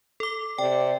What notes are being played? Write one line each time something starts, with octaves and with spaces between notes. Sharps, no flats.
A4 D6
C3 D5 G5